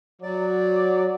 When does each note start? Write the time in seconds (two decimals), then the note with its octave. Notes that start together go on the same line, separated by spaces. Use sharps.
0.22 F#3 D5